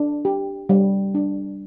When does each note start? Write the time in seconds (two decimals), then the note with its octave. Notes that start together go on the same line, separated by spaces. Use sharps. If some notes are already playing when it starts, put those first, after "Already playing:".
Already playing: D4
0.25 G4
0.69 G3
1.15 D4